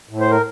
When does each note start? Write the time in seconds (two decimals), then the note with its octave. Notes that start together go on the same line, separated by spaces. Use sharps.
0.09 A2
0.20 C5
0.31 A#4